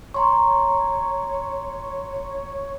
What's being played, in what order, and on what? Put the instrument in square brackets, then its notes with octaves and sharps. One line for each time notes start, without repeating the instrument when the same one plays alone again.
[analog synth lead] C#5 [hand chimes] A#5 C6 C#6